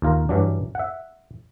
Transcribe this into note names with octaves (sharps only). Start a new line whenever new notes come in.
D#2 F4 A#4
G2 E3 F#3 D4
E5 F#5